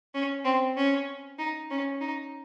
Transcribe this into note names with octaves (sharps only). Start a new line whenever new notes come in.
C#4
C4
C#4
D#4
C#4
D#4